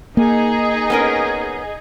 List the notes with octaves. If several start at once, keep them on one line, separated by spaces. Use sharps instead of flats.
A#3 D#4 G#4
B3 C#4 A#4